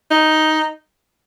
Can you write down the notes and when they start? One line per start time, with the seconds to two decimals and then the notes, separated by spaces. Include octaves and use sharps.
0.11 D#4